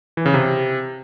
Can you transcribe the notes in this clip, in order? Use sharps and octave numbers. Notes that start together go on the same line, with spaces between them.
E3
C#3
C3